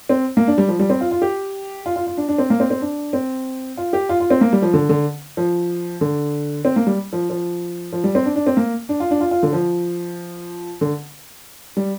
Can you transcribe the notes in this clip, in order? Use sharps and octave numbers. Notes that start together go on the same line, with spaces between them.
C4
A#3
D4
G3
F3
G3
C4
F4
F4
G4
F4
F4
F4
D4
D4
C4
A#3
C4
C4
D4
C4
F4
G4
F4
F4
C4
A#3
G3
F3
D3
D3
F3
D3
C4
A#3
G3
F3
F3
F3
G3
C4
D4
D4
C4
A#3
D4
F4
D4
F4
F4
D3
F3
D3
G3